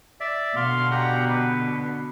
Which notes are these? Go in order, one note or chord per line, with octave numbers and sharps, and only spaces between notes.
D5 E5
B2 D3 F5 C6
G4 F#5 A#5
B4